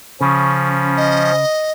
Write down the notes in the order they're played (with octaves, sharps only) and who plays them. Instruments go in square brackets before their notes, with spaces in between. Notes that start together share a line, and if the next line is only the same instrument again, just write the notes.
[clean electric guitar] C#3 [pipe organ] F3 C#4
[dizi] D#5